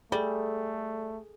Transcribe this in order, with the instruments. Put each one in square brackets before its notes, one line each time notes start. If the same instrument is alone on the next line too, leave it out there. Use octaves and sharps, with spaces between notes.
[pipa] G3 [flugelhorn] A3 [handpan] G#4 A4